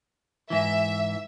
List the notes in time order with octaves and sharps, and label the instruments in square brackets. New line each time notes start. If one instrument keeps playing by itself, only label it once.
[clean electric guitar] G#2 E3 [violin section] E5